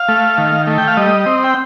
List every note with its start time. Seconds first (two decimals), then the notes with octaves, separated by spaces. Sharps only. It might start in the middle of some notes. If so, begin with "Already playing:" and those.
Already playing: F5
0.08 A3
0.38 D#3
0.67 A3
0.78 G5
0.88 F5
0.97 G3 D#5
1.26 C4
1.44 G5